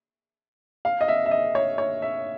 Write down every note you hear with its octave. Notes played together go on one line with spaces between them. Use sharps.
F5
D#5
E5
E5
D#5
C#5
C#5
E5